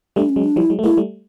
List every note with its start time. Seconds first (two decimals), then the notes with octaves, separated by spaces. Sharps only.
0.16 G3 A3 D4
0.29 C#4
0.36 F#3 G#3
0.44 D4
0.56 F3 G3 E4
0.70 F#3 G#3
0.79 A3
0.84 G#3 A#3 E4
0.97 G3 A3